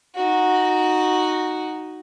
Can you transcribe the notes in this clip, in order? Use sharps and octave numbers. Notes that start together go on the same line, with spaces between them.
D#4 F#4